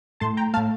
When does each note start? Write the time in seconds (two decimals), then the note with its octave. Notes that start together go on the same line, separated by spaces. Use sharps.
0.20 A2 A3 A5 C6
0.37 G5 A#5
0.54 A3 F5 A5
0.57 A2